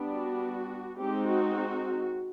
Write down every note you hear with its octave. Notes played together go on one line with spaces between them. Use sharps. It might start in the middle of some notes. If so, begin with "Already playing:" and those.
Already playing: G3 B3 D4
F#4
G#3 C4 D#4 G4
F#4